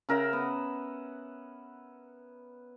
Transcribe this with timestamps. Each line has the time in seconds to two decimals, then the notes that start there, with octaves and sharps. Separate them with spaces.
0.09 C#3 A#4 E5 F#5
0.33 B3